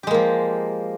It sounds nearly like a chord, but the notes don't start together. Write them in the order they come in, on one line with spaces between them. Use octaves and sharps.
G4 G#3 A#3 F3